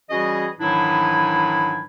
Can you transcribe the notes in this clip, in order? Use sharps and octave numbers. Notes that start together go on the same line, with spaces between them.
E3 G3 C#4 F#4 G#4 D#5
G#2 D#3 E3 F#3 D4 E4